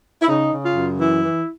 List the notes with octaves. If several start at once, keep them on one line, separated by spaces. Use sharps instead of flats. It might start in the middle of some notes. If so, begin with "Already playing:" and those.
E4
C#3 D#4
C#3
F4
F#2
E3 E4
E3